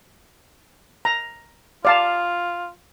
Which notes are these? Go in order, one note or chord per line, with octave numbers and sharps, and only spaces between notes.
A#5
F4 D5 F5 A5